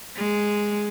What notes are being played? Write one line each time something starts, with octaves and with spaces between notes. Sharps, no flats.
G#3